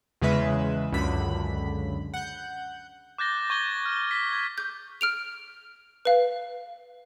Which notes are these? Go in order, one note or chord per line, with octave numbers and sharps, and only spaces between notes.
E2 C#3 G#3 B4 E5
C#2 F#2 D3 B5
F#5 G6
D6 F#6 G6 A6 A#6 G7
C#6 G#6 G7
F6
B6
G#6
D6 G6
F6 D7 F7
B4 F5